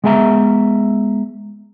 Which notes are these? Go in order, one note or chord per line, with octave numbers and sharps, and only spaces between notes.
G#3 B3 G#4 E5 A#5